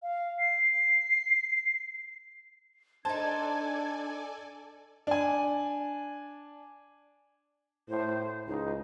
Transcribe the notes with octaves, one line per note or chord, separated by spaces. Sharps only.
F5
C7
D4 D#4 A4 C5 D5 G#5 A5 G#6
D4 G#5
A2 C5
C#2 D#4